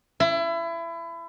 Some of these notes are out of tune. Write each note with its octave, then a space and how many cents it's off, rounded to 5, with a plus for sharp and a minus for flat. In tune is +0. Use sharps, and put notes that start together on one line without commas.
E4 +25